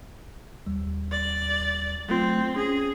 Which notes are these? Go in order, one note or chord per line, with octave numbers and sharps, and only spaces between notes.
D#2 G3
D5
F#3 A3 C4 F4
C#4 G#4